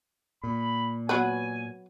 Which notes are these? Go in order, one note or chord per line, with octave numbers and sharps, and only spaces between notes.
A#2 B5
F#3 B3 B4 G#5